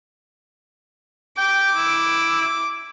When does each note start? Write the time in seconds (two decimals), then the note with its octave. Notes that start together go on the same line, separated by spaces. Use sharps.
1.38 G5 D6
1.76 E4